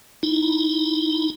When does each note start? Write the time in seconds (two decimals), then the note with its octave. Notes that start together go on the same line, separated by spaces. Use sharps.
0.23 D#4 E4